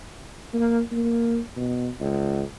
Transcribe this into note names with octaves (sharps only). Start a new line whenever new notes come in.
A#3
A#3
B2
C#2